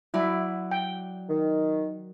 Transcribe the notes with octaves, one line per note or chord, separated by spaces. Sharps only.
F#3 E4 D5
G5
D#3